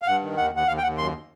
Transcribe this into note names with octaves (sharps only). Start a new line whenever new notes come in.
F5
G2 F#5
D#3
D#2 F#5
D#2 F#5
D#2 F5
G5
D#2 F#5
F#2 C6